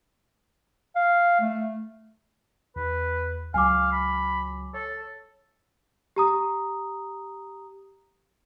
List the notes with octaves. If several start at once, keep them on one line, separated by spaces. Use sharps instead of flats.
F5
A3
E2 B4
C#2 F#3 F5 G#5 D6
B5
A4 C#5
G4 A#5 D#6